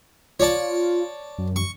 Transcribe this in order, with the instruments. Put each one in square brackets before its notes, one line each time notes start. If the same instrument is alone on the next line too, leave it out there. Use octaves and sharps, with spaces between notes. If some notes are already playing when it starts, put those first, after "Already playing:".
[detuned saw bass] F4 [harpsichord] C#5 D5 A5
[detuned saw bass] F#2
[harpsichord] C#6